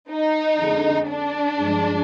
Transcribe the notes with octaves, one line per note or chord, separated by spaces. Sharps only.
D#4
F2 D3 G#3
D4
G2 F3 G#3